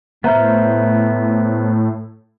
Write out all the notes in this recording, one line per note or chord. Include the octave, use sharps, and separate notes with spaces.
A2 B3 C5 E5 A#5 F6